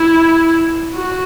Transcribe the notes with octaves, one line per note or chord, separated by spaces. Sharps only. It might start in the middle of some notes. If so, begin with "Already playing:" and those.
Already playing: E4
F#4